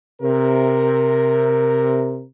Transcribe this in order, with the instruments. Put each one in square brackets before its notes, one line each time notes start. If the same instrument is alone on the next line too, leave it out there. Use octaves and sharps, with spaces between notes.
[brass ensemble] C3 A#4